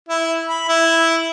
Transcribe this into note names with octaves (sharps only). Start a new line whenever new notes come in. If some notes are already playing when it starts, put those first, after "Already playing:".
E4
B5
E4